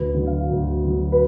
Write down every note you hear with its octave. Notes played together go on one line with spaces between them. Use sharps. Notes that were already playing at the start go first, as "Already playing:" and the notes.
Already playing: D2 B4
D3 F#3
F5
D2
D3 F#3
B4